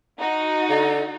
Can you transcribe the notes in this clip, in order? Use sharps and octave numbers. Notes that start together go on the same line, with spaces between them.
D#4 F#4
D3